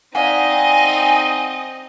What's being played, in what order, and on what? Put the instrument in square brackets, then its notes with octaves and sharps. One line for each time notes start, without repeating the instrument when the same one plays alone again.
[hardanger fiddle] C4 D#4 [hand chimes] D5 F5 F#5 [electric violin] D#5 [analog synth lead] G#5